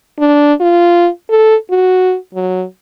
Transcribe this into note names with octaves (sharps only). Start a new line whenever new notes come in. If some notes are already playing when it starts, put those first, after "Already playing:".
D4
F4
A4
F#4
F#3